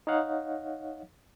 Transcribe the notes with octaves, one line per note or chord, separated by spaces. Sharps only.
D#4 C#5 D#5 F5 F#5